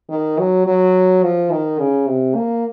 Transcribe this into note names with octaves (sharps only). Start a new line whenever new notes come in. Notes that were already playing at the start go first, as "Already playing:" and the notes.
D#3
F#3
F#3
F3
D#3
C#3
C3
A#3